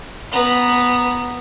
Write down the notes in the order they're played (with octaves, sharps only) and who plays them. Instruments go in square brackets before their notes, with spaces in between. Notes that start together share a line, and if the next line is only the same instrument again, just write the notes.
[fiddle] B3 A#5